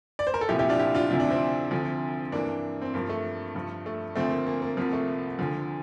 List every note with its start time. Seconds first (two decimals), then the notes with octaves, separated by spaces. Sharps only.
0.19 D5
0.27 C5
0.34 A#4
0.41 A4
0.49 C2 A#2 F3 E4 G4
0.59 E4 G4
0.69 D4 F4
0.79 E4 G4
0.95 D4 F4
1.10 D2 C3 F3 E4
1.20 D4
1.29 C4 E4
1.71 D2 D3 F3
2.32 G2 E3 A#3 D4
2.82 C4
2.94 G2 F3 A#3
3.09 A3
3.55 G2 F3
3.86 A3
4.15 D2 D3 F3 A3 C4
4.31 A#3
4.47 A#3
4.62 A#3
4.77 C2 C3 F3 A#3
4.93 A3
5.39 D2 D3 F3